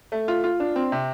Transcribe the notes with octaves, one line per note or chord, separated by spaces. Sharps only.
A3
F4
F4
D4
C4
C3